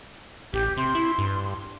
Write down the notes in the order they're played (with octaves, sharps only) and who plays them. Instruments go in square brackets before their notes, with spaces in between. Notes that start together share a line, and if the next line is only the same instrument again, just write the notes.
[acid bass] A1 [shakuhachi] G4
[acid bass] C3 [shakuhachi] C6
[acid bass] E4
G2